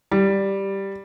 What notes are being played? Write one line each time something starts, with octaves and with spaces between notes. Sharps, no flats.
G3